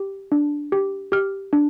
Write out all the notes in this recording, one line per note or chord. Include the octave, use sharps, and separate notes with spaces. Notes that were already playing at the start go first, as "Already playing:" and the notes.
Already playing: G4
D4
G4
G4 F6
D4